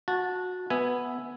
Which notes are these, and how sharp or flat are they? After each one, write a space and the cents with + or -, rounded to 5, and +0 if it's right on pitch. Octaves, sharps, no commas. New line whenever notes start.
F#4 -20 A5 +0
B3 +0 E5 +0 G#5 +0